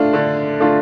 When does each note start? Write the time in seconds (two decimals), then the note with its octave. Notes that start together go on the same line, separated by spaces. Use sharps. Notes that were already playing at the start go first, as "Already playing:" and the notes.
Already playing: A3 D4 F4
0.13 D3
0.60 A3 D4 F4